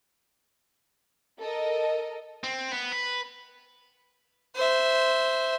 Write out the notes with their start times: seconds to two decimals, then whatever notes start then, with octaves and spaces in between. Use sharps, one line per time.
1.40 A4 A#4 D#5
2.44 C4
2.72 B3
2.92 B4
4.55 C5 E5